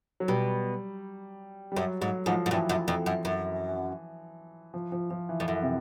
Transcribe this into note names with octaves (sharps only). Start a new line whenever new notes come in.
F#3
B2 G3
G3
F#2 F#3
G#2 F#3
G#2 F3
G#2
G2 E3
F#2
F2
F#2
F#2
F3
F3
F3
E3
F2
F#2 E3
C3